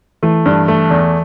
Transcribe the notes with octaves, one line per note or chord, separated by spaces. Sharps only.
E3 A3
G2
A3
E2